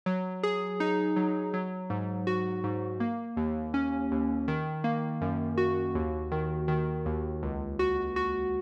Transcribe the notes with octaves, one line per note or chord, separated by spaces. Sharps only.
F#3
G#4
D#4
F#3
F#3
G#2
F#4
G#2
A#3
D#2
C#4
D#2
D#3
A#3
F#2
F#4
D#2
D#3
D#3
D#2
C#2
F#4
F#4